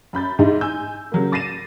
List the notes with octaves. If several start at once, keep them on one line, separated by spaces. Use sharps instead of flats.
F#2 B5 G6 A6
G#2 D#4 E4
G#5 E6 G6
C#3 F#3 A#3
D6 A6 A#6 C7 D#7 E7